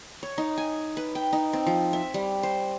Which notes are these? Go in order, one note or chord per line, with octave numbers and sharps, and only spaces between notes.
C#5
D#4
G#5
B4
G5
D#4
C4
F3
E5
G3
C5